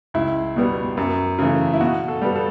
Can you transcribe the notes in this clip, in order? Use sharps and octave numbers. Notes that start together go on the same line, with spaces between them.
C#2 E4
B2 G3 B3
F#2
C#3 E3 A3
E4
B2 F#4
A4
G3 B3
A4